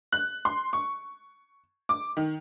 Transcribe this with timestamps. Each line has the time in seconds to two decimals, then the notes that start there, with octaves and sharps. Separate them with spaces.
0.12 F#6
0.45 C6
0.73 C#6
1.89 D6
2.17 D#3